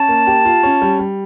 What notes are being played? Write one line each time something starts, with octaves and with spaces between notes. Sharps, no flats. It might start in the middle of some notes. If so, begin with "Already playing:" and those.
Already playing: C#4 A5
A#3
G4
F4
C#4
G3
G3